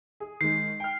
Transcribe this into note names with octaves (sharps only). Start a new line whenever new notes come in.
G#4
D#3 G#3 C7
G5 F6